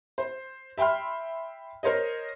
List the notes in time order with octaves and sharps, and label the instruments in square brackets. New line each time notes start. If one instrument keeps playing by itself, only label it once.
[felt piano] C5
E5 G5 B5 C6 F6
A#4 C5 C#5 D#5